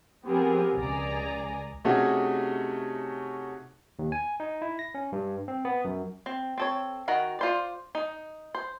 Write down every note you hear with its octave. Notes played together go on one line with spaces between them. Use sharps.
F3 B3 C4 G4 G#4 A#4
C#2 G#4 D5 G#5 A#5
C3 A3 C#4 D#4 F#4 G#4
D#2
G#5
D#4
E4
A#6
C#4
G2
C4
B3
F#2
C4
C4 A4 C#5
D#3 F#4 A#4 F#5
F4 C5 D5
D#4
C5